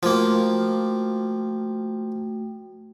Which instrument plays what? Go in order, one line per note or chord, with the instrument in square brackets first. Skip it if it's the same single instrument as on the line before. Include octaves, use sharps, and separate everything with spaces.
[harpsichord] F3 A#3 [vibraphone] A3 F#4 G5